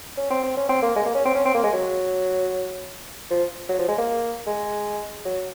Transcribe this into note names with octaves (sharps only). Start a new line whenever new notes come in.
C#4
C4
C4
C#4
C4
A#3
G#3
A#3
C#4
C4
C#4
C4
A#3
G#3
F#3
F3
F#3
F3
G#3
A#3
G#3
F#3